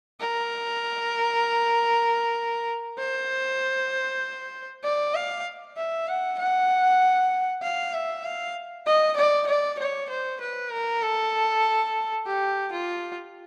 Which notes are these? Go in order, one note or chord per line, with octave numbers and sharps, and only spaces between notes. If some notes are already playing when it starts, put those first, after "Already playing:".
A#4
C5
D5
F5
E5
F#5
F#5
F5
E5
F5
D#5
D5
D5
C#5
C5
B4
A#4
A4
G4
F4